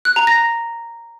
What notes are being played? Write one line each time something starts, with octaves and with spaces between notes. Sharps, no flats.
F#6
A#5
A#6